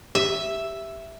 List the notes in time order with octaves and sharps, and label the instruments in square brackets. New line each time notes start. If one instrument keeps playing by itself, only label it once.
[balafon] G4 [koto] E5